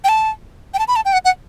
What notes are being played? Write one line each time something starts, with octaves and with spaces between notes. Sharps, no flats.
G5
A5
G5
A5
B5
A5
G5
F#5
F#5